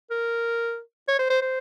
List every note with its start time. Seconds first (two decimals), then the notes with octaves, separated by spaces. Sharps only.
0.10 A#4
1.08 C#5
1.19 C5
1.30 C5
1.42 C5